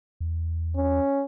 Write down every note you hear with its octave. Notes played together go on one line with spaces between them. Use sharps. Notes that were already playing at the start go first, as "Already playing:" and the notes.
E2
C#4